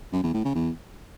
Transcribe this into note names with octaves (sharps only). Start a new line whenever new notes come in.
F#2
E2
A2
C#3
E2